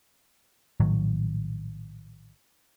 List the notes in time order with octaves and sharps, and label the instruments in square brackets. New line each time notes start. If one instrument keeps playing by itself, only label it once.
[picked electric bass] A#1 A2 D#3 F#3